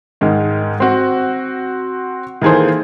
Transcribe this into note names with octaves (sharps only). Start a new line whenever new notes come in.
G#2 D#3 G#3
C4 F#4
D#3 E3 A#3 G#4 A4 C5